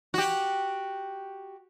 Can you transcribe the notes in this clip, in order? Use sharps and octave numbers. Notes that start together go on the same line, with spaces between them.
F#4 G4